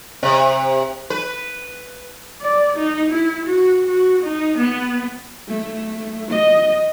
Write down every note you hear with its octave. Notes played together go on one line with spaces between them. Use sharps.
C3
B4
D5
D#4
E4
F#4
F#4
D#4
B3
A3
D#5